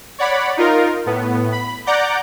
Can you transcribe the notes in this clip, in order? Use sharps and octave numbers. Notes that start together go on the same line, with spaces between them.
C#5 D5 F#5 B5
D#4 F4 A#4
A2 B3
B5
D5 F#5 A#5 D6 G6